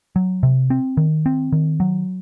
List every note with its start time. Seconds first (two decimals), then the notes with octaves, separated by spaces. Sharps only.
0.16 F#3
0.43 C3
0.70 C4
0.97 D#3
1.26 C4
1.52 D#3
1.80 F#3